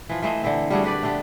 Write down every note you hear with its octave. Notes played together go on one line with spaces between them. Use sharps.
E3 F3
E3 A3 C5 D#5
D3 E3 C4
G3 A3 F#4 G#4
D4 G4 B4 D5
A3 B3 D4 G4